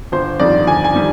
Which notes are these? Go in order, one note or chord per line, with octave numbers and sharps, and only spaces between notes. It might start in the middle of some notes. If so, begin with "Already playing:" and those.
G1 C5
F2 D#3 G3 D5
G1 G#5
G#5
D#3 G3